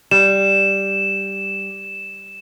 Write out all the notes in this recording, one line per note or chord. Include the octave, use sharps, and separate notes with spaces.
G3 E7